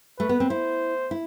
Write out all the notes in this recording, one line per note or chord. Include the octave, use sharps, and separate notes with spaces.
A3 B4
B3
C4
E4 C5
E4